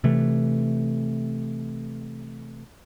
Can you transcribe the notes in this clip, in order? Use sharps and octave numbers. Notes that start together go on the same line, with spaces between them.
C3 E3 A3